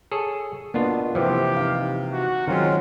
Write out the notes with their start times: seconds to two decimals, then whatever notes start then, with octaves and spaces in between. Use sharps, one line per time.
0.12 G#4 A4 C#5
0.74 B2 A#3 B3 D4 F4
1.15 C3 E3 F3 G4 C5
1.57 D#4 F5
2.13 F#4
2.48 D#3 F#3 G#3 C4 C#4 D#4 F4